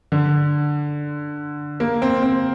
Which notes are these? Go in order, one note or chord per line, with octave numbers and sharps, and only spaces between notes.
D3
A#3
C4
C4